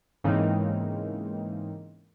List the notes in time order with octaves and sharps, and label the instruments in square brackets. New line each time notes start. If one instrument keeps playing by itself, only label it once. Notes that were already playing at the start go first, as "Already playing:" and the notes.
[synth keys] G#2 C#3 E3 A#3 C4 D#4